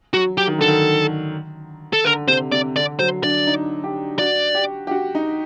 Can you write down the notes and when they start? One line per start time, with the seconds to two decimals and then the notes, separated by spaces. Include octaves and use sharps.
0.14 F#3 F#4
0.37 F#3 G4
0.47 D#3
0.58 D3 A4
0.68 D#3
1.93 A4
2.04 D3 A#4
2.28 C3 C5
2.52 C3 D5
2.76 D3 D5
2.99 F#3 C5
3.23 D4 D5
3.47 D#4
3.84 G4
4.19 F#4 D5
4.55 G4
4.87 G4
4.91 F#4
5.15 D#4